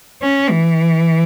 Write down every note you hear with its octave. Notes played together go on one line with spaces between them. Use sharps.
C#4
E3